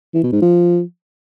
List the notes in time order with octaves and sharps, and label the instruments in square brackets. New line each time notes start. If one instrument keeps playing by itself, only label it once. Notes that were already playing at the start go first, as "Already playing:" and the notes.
[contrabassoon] E3
B2
G#2
F3